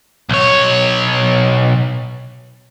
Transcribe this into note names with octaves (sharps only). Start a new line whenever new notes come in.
B1 C#5